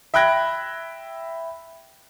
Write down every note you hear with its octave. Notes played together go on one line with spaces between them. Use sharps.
E5 G5 B5 F#6 G#6 A#6